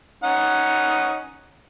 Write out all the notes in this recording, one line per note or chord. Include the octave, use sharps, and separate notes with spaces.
C#4 D#4 F#5